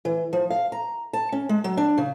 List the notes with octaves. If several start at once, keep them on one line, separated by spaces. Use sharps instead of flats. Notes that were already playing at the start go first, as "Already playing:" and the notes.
E3
F3
F5
A#5
A5
C#4
G#3
F#3
D4
C#3